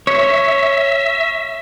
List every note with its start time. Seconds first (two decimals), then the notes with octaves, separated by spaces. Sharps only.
0.07 C#5 E5